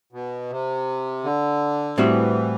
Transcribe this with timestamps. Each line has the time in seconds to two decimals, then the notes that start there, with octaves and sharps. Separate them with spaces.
0.13 B2
0.50 C3
1.24 D3
1.97 A2 E3 G3 C4 F#4